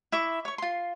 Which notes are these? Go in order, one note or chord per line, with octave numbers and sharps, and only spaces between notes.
E4 E5 C#6 D6
C#5 C#6
F4 C6